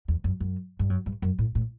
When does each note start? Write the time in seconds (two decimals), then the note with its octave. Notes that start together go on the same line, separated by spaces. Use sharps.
0.08 E2
0.24 F#2
0.40 F#2
0.79 G2
0.90 F#2
1.06 G2
1.22 F#2
1.39 A2
1.55 A2